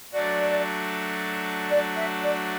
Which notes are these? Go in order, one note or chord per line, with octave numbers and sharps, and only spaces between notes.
F#3 A3 D4 F#4 D5
D5
E5
D5